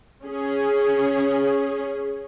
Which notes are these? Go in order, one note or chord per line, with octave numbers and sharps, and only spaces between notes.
C#4 G#4